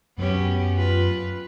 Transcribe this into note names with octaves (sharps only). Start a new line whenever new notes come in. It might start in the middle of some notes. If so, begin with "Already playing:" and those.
F#2 F#3 B3 C#4 G4
F4 B4